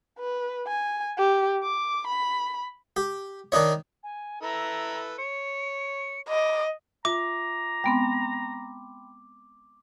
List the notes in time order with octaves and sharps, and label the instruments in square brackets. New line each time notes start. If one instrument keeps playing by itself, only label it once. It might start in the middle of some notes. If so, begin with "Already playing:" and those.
[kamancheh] B4
G#5
G4
D6
B5
[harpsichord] G4
D#3 D4 D#4 C#5
[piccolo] G#5
[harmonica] E4 A4 B4 [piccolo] A#5
[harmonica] C#5 [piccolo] C#7
[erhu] D#5 [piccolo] D6
[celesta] F4 E5 [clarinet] A#5 [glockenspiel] D6
[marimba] G#3 B3 C4 [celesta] G5 B5 C6